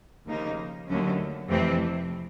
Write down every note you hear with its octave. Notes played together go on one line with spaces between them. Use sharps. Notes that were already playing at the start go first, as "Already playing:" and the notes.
D#2 C#3 F3 A#3 D#4
D#2 D3 F#3 A3 C#4
F2 C3 E3 A3 C4